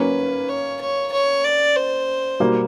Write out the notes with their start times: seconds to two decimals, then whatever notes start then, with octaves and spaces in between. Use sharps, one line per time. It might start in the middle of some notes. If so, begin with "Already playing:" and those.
Already playing: F#3 A#3 C#4 B4
0.48 C#5
0.81 C#5
1.12 C#5
1.44 D5
1.76 C5
2.40 B2 G3 A#3